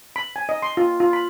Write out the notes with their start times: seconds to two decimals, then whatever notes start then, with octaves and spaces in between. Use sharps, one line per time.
0.16 B5
0.36 G#5
0.49 D#5
0.62 C6
0.77 F4
1.00 F4
1.13 B5